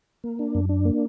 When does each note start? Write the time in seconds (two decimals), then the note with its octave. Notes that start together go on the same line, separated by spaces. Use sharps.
0.24 A#3
0.39 D4
0.55 F#2
0.69 D4
0.85 A#3